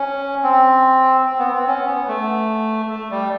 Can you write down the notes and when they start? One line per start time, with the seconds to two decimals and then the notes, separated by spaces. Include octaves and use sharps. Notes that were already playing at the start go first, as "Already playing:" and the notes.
Already playing: C#4
0.43 C4
1.26 C4
1.39 B3
1.53 C4
1.67 C#4
1.87 B3
2.08 A3
2.90 A3
3.11 G3